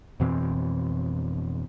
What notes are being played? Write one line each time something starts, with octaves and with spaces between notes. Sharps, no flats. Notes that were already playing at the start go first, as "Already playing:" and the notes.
F2 B2 E3 C4